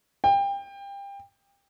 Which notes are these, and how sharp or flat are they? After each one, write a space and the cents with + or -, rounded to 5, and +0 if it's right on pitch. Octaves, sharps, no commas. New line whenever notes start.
G5 +25